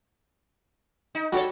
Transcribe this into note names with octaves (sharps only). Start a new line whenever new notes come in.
D#4
G3 D4 F#4 A4 C#5